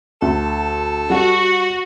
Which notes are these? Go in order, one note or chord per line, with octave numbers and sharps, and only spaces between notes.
D2 A4
G3 F#4 F#5